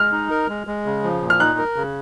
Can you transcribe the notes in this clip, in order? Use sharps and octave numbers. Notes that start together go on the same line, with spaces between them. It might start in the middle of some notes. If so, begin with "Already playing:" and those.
Already playing: G#3 F6
D#4
A#4
G#3
G#3
C#3
F3
A#2
F6
D#4 F#6
A#4
C#3